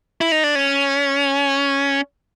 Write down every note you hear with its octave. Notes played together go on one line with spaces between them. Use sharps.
E4
D#4
D4
C#4